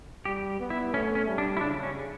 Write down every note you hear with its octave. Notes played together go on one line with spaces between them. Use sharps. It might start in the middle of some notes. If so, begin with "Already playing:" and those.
G3 G4
B3
E4
A3 C#4
C#4
G3
D4
E4
C#3 D4
C#4